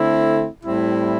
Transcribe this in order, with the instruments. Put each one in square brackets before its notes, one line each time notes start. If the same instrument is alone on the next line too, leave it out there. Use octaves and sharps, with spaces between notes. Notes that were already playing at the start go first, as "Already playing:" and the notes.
Already playing: [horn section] D3 A3 C4 E4
A2 G3 C4 E4